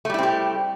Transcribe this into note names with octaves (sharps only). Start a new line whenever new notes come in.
G3 A3 C4 E4 G4